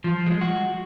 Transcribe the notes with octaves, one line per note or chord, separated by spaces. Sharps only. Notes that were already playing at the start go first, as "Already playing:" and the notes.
F3
G#3
F#4